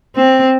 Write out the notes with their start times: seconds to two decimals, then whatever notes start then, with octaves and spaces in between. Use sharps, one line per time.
0.16 C4